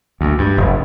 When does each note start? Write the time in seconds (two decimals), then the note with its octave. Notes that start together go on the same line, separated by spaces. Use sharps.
0.21 D2
0.38 G2
0.57 F1